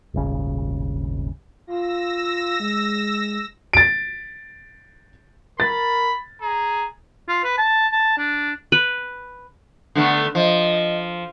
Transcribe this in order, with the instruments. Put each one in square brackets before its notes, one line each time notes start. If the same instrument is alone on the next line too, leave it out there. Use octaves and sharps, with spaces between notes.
[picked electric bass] D#1 G#1 C#3
[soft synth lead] F4 [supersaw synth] E6 A#6
[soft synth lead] G#3
[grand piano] A6 D7
[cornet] A#4 [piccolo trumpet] B5 [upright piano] A6
[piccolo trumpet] G#4 [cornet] A#5
[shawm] F4
B4
A5
A5
D4
[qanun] B4
[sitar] D3 A3 B3
[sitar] F3 [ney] D#5